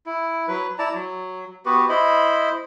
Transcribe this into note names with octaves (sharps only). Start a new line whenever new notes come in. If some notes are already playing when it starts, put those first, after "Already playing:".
E4
F#3 B4
E4 D5 A5 A#5
F#3
B3 F#4 G4 B4
E4 C5 D#5 B5